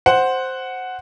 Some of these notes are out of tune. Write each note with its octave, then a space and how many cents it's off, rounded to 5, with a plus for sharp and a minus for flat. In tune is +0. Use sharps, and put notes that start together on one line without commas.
C5 +0 F#5 +0